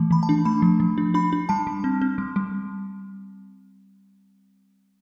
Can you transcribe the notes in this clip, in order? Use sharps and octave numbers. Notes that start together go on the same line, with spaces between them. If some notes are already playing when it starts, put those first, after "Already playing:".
Already playing: E3 A3
E3 B5
A5
D4
A3 B5
F3
F3
D4
D4 B5
D4
G3 A5
G3
C4
C4
G3
G3